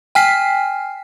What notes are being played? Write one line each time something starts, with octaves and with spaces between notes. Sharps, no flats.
G5 G#5 F6 B6 C7